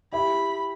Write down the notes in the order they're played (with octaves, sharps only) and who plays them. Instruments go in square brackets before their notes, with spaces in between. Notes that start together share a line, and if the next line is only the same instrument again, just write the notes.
[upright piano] E4 G4 [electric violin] B5